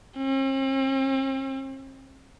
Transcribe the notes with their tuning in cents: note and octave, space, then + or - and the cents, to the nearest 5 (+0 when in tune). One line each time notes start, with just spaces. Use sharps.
C4 +45